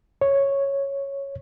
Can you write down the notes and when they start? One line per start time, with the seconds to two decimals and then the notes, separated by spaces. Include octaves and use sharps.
0.21 C#5